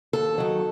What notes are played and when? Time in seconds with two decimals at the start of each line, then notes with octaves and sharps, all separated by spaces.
0.13 D#2 A4
0.38 D#3 F#3